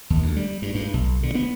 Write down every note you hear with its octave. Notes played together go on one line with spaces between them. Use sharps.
D#2
D2
G3
G2
G2
B1
D3
B3